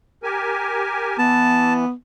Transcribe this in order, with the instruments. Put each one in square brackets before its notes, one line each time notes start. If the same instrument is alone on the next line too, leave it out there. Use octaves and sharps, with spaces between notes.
[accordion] G4 A#4 G#5
[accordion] E3 [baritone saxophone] B3 [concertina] A5